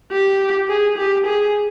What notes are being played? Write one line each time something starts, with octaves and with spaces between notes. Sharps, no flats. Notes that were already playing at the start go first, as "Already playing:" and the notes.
G4
G#4
G4
G#4